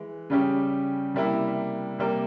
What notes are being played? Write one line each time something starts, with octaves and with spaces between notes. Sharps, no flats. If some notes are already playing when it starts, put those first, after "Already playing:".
Already playing: E3 G#3
C#3 G3 C#4 G4
C3 G3 A#3 E4
C3 G3 A#3